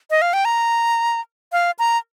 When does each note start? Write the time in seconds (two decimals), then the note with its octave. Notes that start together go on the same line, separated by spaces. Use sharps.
0.10 D#5
0.22 F5
0.33 G5
0.45 A#5
1.52 F5
1.79 A#5